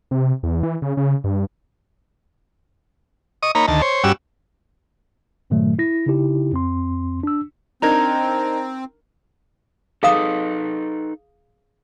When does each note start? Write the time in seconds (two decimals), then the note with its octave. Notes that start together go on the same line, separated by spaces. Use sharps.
0.11 C3
0.43 E2
0.63 E3
0.82 C#3
0.97 C#3
1.24 G2
3.43 D#5 C#6 D#6
3.55 A#3 D#4 C#5 A#5 B5
3.68 D2 D#3 A5
3.82 C5 C#5
4.04 G2 G3 C#4 F#4 E6
5.50 G2 A#2 D#3 F#3 A3
5.79 E4 A#6
6.06 C#3 D#4 E4 G4
6.52 F2 C4 C6
7.23 D4 E6
7.82 C4 D4 D#4 A#4 A#5 G#6
10.03 D#4 G#4 A4 B4 F5 D#6